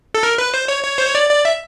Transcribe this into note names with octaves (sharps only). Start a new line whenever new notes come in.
A4
A#4
B4
C5
C#5
C#5
C5
C#5
D5
D5
E5